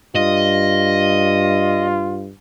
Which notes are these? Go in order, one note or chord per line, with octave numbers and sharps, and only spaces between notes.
G2 F4 D#5